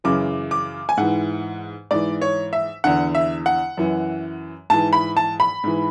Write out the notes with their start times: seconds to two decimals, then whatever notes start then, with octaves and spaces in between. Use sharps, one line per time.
0.04 F#2 C#3 E3 D6
0.51 D6
0.89 G#5
0.97 G#2 E3 F#5
1.91 G#2 E3 D5
2.21 C#5
2.53 E5
2.84 E2 D3 F#5
3.15 E5
3.46 F#5
3.77 F#2 E3
4.70 G#2 E3 A5
4.93 B5
5.17 A5
5.40 B5
5.64 G#2 E3